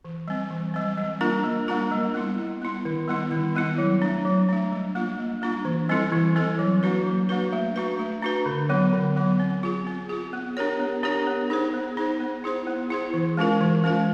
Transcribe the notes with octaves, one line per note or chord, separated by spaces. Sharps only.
E3
G3 C4
E3
G3 C4
G3
A#3 D4 F4 A#4
G3
A#3 D4 F4 A#4
G3
B3 E4
G3
B3 E4
D#3
G3 B3 E4
D#3
G3 B3 E4
F#3
A3 D4
F#3
A3 D4
G3
A#3 D4 F4
G3
A#3 D4 F4
E3
G3 C4 E4 A4
E3
G3 C4 E4 A4
F#3
A#3 D4 F#4 B4
F#3
A#3 D4 F#4 B4
A3
D4 F#4 B4
A3
D4 F#4 B4
D3
F#3 B3
D3
F#3 B3
C4
F4 G#4
C4
F4 G#4
B3
D4 G4 A#4 C#5
B3
D4 G4 A#4 C#5
B3
D#4 G#4 C5
B3
D#4 G#4 C5
B3
E4 G#4 C5
B3
E4 G#4 C5
E3
G#3 C#4 F4 A#4
E3
G#3 C#4 F4 A#4